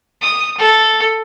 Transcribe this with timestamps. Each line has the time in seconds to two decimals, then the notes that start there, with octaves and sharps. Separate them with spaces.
0.22 D#6
0.58 A4